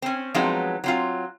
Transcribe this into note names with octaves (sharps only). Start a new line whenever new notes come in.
C4 C#4
F3 F#3 G#3 B3 C4 D#4
F#3 C4 F4